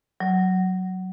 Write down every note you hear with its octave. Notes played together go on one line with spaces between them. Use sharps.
F#3